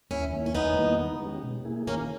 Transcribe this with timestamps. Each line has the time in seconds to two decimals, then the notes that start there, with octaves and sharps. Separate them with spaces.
0.11 D#2 C#4 E4
0.33 D#3 A#3 E4
0.46 C#4
0.55 E2 B3 D#4
0.77 D#3 G3 A#3 E4
0.99 D#3
1.21 G#3 C#4 G4
1.43 B2
1.65 A#3 E4 G#4
1.87 D#3 A#3 C#4